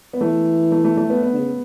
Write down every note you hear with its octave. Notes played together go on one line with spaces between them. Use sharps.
B3
E3 A3
A3
A3
A3
B3
B3
D3
C#3